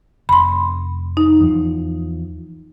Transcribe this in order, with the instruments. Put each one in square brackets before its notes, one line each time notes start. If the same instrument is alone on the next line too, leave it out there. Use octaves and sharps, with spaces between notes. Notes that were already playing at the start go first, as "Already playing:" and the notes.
[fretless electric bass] F1 [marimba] B5 C6
[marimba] D#4
[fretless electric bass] E2 F3